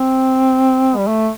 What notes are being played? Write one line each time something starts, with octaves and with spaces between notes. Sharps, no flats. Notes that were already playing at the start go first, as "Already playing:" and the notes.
Already playing: C4
G3
A3